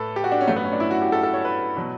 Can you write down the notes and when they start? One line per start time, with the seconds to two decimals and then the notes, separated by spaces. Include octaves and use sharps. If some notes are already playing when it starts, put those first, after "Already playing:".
Already playing: A2 A4 B4
0.16 G4
0.24 F#4
0.32 D4
0.41 C#4
0.47 G2 F#3 A3
0.56 B3
0.64 C#4
0.73 D4
0.80 E4
0.91 F#4
1.02 G4
1.12 A4
1.23 A4
1.33 C#5
1.45 B4
1.77 B2 F#3